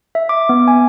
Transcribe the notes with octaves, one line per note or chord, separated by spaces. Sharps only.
E5
D6
B3
G#5